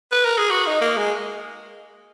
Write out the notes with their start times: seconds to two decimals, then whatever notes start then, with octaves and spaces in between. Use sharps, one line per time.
0.12 B4
0.25 A#4
0.38 G#4
0.50 F#4
0.66 D#4
0.81 A#3
0.97 G#3